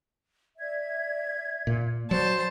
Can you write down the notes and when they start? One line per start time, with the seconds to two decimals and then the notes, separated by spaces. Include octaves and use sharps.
0.58 D5 E5 G#6
1.67 A#2
2.11 F#3 C5 D5 A5